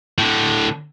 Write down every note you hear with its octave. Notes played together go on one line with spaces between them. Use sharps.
A2 D3